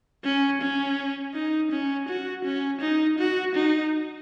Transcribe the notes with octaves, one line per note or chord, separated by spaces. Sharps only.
C#4
C#4
D#4
C#4
F#4
C#4
D#4
F#4
D#4